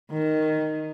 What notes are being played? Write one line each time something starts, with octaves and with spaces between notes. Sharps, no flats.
D#3